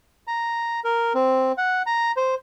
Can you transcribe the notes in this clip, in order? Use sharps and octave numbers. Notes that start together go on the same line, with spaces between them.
A#5
A#4
C4
F#5
A#5
C5